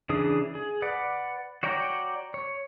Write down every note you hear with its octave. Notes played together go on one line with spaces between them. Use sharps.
C#3 E3 D4 G#4 D#6
G#4
B4 D5 F#5
F#4 C#5 D5 G5 A#5
C#5